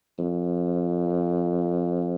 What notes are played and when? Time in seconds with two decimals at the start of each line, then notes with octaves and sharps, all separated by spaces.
0.19 F2